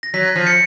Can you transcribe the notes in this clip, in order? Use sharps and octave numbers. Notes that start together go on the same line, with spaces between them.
A#6
F#3 B6
F3
C#7